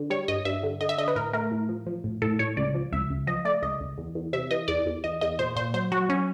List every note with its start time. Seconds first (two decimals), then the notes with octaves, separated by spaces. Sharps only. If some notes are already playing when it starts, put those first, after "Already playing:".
Already playing: D3
0.10 G3 C#5
0.28 G2 D#5
0.45 G2 E5
0.63 D3
0.81 D3 D#5
0.89 E5
0.98 D3 D#5
1.08 B4
1.16 A2 A#4
1.33 A3 A#4
1.51 A2
1.69 F3
1.86 F3
2.04 A2
2.22 A2 A4
2.39 A2 C#5
2.57 C#2 D5
2.75 F3
2.92 C#2 E5
3.10 C#2
3.27 F3 D#5
3.45 A3 D5
3.62 C#2 D#5
3.80 C#2
3.98 E2
4.15 E2
4.33 C3 E5
4.51 E3 D#5
4.68 E2 D5
4.86 E2
5.04 E2 D#5
5.21 E2 D#5
5.39 A#2 C5
5.56 A#2 C5
5.74 F#3 C5
5.92 F#3 F#4
6.09 F#3 C#4